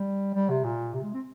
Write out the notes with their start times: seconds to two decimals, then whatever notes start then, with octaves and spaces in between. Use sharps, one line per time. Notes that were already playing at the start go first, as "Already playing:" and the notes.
Already playing: G3
0.35 G3
0.49 C3
0.64 A#2
0.94 C3
1.03 G#3
1.14 C4